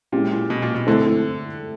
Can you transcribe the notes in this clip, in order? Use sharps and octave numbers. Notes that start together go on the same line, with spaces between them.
A#2 G#3 C#4 E4 G4
A#2
B2
A#2
B2
D3 A3 C4 E4 A4